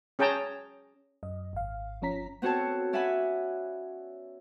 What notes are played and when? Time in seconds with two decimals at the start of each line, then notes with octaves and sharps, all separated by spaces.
0.19 C#4 G#4 G5 A5 A#5
1.23 F#2 D#5
1.53 G#1 F5
2.01 G1 F3 C#4 A#5 B6
2.42 B3 C4 F#4 A4 C#5 A5
2.93 C#4 D5 E5 F#5 G#5 B5